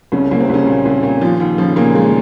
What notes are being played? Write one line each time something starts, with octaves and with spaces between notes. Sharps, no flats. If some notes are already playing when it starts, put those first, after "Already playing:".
C2 C#3 C#4
C2 A#3
C3 C4
C2 C#3 C#4
A#2
C2
A#2
D#2 F3 F4
D#2
C#3 F3 F4
A#2 C#3 A#3
D#2 G#3